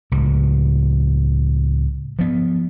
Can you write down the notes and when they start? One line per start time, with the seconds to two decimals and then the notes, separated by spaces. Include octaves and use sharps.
0.12 C#2 A2
2.19 F3 B3